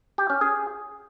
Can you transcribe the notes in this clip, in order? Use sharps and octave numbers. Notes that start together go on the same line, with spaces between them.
G4
C#4
G#4